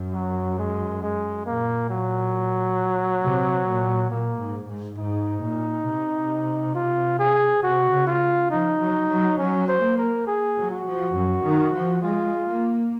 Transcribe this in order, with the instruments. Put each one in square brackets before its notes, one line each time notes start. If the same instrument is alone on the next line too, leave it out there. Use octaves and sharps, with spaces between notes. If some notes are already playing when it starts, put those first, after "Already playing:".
Already playing: [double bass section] F#2
[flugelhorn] F#3
G#3
G#3
[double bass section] A#2 [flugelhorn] A#3
[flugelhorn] F#3
[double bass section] C3
A#2
[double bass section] A#2 [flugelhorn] A#3
[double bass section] G#2
G#2
[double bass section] G#2 [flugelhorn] D#4
[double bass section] A#2
C3
[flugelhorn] F4
G#4
[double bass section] C3 [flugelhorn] F#4
[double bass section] C#3
[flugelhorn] F4
[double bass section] F3 [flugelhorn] D#4
[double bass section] F#3
F#3
[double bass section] F#3 [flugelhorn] C#4
[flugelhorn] C5
[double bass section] A#3
[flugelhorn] A#4
G#4
[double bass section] F#3
[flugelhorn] F#4
[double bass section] F3
F#2
D#3
F3
[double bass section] G#3 [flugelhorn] F4
[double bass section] A#3